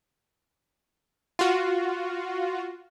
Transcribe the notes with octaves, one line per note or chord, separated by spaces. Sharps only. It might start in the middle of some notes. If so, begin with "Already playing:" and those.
F4 F#4